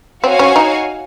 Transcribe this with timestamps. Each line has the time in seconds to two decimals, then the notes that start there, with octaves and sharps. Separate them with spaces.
0.24 C4 F#4 C#5 F5 G#5
0.39 C#4
0.56 D#4